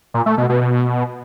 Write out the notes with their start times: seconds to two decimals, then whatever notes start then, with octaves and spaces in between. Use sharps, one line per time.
0.14 A#2
0.26 A3
0.38 B2
0.49 B2
0.61 B2